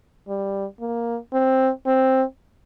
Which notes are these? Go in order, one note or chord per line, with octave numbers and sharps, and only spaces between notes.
G3
A#3
C4
C4